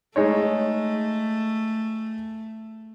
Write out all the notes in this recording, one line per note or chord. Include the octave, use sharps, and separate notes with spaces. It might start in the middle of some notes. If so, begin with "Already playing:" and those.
G#3 A3 D#4 C#5